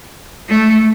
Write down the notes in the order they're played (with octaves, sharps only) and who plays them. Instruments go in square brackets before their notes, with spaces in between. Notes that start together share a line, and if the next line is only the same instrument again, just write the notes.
[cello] A3